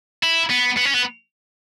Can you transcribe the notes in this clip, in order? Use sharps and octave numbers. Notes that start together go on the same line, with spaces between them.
E4
B3
B3
C#4
B3